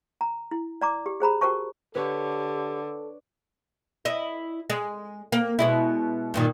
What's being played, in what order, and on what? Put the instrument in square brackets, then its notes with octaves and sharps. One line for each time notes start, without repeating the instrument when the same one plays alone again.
[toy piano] A#5
E4
D5 A#5 D6
G4
G#4 C5 A#5 B5
F#4 G4 A#4 C5 A5 C#6
[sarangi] D3 [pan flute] G4 [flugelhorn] A4 [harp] B4 C#5 C#6
[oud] E4 D#5
G#3
A#3
B2 G#3 E4
G2 A#2 D#3